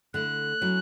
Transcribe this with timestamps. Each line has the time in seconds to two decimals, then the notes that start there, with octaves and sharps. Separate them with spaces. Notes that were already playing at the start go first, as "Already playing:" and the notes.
0.14 D3 A3 E4 F#6
0.61 F#3 C#4 E4